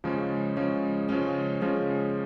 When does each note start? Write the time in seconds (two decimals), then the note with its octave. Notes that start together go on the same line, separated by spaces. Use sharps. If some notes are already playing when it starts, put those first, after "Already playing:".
0.04 C#3 F3 G#3 C#4
0.57 C#3 F3 G#3 C#4
1.09 C#3 F3 G#3 C#4
1.62 C#3 F3 G#3 C#4